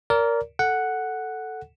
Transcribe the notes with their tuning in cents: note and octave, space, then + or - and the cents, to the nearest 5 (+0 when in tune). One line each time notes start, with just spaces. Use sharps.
A#4 +0 D5 -30
A4 +0 F#5 +0